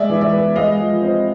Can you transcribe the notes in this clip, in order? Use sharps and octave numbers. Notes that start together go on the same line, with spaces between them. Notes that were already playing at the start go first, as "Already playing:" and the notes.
Already playing: G#3 D5 E5
E3
D5 E5
B3
G#3 D#5 F5
F3
C4